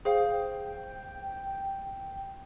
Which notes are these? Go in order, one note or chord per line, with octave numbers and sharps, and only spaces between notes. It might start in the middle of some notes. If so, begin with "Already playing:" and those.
G#4 C5 F5 G5